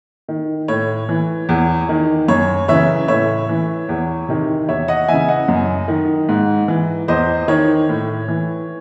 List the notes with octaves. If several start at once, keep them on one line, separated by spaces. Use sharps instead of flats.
D#3
A2 C#5
E3
E2
D#3
F#2 C#5
C#3 E3 C#5 E5
A2 C#5 E5
E3
E2
C3 D#3
E2 C#5 E5
D#5 F#5
C#3 E3 E5 G#5
D#5 F#5
F#2
D#3
G#2
E3
E2 C5 D#5
D#3 C#5
A2
E3